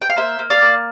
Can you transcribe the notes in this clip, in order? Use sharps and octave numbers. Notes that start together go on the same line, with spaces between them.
G5
F5
A#3 C5 E5
A#3
D5 F5
A#3